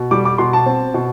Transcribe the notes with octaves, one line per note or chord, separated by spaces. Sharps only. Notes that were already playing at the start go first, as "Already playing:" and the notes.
Already playing: B2
G3 D6
D6
B2 C6
A5
C4
B2